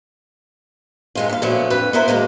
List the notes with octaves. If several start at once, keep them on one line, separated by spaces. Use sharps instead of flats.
G2 G#3 F4
D#2 F5
A#2 D3 F3 F#3 A3 B3
F2 D3 B4
B3 E4 A#4 C5 E5
F#2 D#3 G#3 A#3